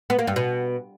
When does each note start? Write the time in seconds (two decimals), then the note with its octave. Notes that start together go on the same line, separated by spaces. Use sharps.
0.10 B3
0.19 A#3
0.27 G2
0.36 B2